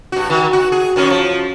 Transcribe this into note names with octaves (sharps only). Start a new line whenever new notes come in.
G2 F#4
D#3
F#4
G#4
F#2 D#3 C#4
F3